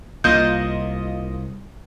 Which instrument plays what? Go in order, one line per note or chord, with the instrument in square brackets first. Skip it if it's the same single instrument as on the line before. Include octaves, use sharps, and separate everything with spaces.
[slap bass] C2 C3 [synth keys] A#3 F4 D#5 [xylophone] G6